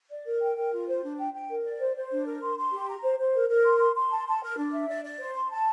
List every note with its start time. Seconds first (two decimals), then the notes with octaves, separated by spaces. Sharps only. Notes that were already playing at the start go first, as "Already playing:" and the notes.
0.09 D5
0.26 A#4
0.41 G5
0.56 A#4
0.72 F4
0.87 C5
1.02 D4
1.18 G5
1.33 G5
1.49 A#4
1.64 D5
1.80 C5
1.96 C5
2.11 D4
2.26 A#4
2.42 C6
2.58 C6
2.72 G4
2.88 A#5
3.03 C5
3.19 C5
3.35 A#4
3.49 A#4
3.65 C6
3.80 C6
3.96 C6
4.11 A5
4.27 A5
4.43 A#4
4.58 D4
4.73 E5
4.89 D5
5.04 D5
5.20 C5
5.35 C6
5.50 A5